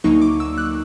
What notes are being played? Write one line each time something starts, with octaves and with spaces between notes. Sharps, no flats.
D2 D3 F#3 A#3 D#4 C#6
D6
E6
F#6